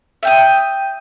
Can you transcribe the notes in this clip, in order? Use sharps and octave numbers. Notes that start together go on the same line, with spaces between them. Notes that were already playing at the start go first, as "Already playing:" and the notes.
E5 G5 D#6